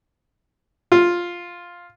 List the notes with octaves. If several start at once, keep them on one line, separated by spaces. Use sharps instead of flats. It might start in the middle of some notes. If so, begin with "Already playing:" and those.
F4